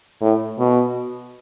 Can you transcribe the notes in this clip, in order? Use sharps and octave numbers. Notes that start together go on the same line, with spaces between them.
A2
B2